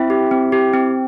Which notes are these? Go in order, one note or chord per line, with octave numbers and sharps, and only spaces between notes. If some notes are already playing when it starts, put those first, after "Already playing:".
Already playing: C4 E4 E5
G4
C4
G4
C4